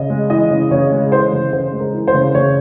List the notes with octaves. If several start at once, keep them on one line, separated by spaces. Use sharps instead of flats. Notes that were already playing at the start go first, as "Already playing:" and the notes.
Already playing: C#3 D#5
G#3
E3 D#5
C#3
C#3 C#5
G#3
E3 C5
C#3
C#3 C5
G#3
A#4
E3
C5
C#3
C#3 C#5